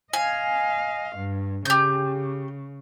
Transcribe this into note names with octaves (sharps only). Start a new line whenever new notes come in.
D#5 F5 G#5
G2
C#3 G4 G6